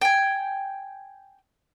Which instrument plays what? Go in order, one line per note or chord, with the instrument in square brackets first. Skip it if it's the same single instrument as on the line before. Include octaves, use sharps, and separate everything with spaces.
[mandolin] G5 G#5